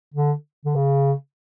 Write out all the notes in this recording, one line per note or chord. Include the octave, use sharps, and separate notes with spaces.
D3
D3
C#3